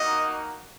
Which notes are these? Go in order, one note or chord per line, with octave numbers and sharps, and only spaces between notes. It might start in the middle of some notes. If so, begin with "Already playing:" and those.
Already playing: A#3 D#4 F#4 D#5